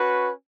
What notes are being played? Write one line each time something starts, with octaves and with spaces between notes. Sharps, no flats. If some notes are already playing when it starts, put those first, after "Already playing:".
Already playing: C#4 F#4 B4